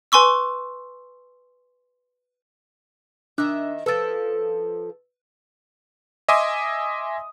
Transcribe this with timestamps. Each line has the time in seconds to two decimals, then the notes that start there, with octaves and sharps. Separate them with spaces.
0.12 B4 G#5 C6 C#6 E6
3.38 D#3 D4 D#5 E5 D6 F#6
3.86 F3 A4 B4 E6 A6
6.28 D#5 E5 G#5 C6 D6 D#6